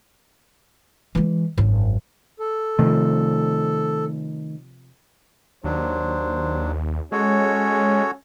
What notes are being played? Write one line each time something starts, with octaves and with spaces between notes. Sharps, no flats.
E3 G#3
G#1 F#2
A4
C3 D#3 F3 A3
D#2 F#3 D4 C5
G#3 C#4 F#4 A4 C#5